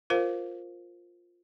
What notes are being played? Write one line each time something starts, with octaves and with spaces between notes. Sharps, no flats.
F4 A#4 C5 F5